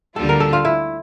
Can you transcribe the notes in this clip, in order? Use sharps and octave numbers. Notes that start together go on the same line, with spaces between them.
D2 D3 G3 A#3 F4 A4
A#4
A4
F4
E4